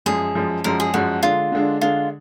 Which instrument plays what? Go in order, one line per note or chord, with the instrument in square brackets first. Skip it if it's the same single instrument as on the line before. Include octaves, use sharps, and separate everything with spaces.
[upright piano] F#2 F3 G#3 [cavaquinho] G#4
[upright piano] F#2 F3 G#3
[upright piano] F#2 F3 G#3 [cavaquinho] A#4
[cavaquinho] G#4
[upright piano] F#2 F3 G#3 [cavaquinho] F#4
[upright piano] D3 G#3 D4 [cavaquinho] F4
[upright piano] D3 G#3 D4
[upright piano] D3 G#3 D4 [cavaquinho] F4